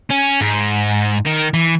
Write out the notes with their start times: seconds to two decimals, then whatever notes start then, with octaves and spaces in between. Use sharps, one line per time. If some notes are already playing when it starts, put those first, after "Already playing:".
0.10 C#4
0.41 G#2
1.26 D#3
1.54 E3